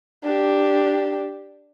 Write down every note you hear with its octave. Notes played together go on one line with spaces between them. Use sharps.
D4 G4